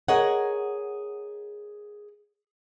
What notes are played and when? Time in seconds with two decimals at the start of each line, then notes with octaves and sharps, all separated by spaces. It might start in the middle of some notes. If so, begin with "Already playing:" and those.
0.08 G#4 A#4 C#5 D#5 F#5